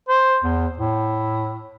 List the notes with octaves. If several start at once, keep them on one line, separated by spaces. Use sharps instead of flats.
C5
E2
A2